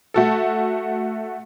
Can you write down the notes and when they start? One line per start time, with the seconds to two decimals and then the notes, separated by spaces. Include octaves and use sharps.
0.14 A3 F#4 A4